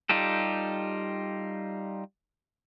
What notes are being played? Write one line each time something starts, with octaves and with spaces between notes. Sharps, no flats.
G3 D#4 F4 G4 A4